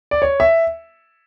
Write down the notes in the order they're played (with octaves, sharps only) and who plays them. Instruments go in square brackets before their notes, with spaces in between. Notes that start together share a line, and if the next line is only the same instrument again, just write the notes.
[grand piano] D5
C#5
E5